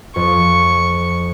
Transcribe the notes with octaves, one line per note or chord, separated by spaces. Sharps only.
F2 C#6